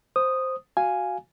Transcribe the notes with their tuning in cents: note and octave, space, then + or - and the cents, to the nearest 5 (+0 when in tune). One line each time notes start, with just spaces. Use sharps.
C5 +0 D#6 -5
F#4 +0 F5 +0 G#5 +0